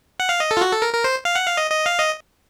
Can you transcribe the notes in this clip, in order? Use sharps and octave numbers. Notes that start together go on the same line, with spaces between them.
F#5
F5
D#5
A4
F4
F#4
A4
A#4
A#4
C5
F5
F#5
F5
D#5
D#5
F5
D#5